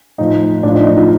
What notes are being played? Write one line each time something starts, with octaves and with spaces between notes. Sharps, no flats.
A2 F3 D#4
A2 D4
F3
D#4
D#4
F4